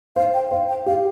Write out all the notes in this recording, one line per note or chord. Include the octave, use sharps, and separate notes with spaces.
C5 F5
G5
C5 F5
G5
G4 F5